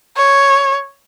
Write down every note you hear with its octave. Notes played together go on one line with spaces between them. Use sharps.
C#5